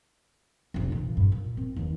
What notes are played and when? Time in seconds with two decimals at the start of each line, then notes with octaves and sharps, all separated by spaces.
0.74 F1 A#1
0.92 A#2 E3
1.17 G2
1.32 A#2
1.57 C4
1.76 D#2 E3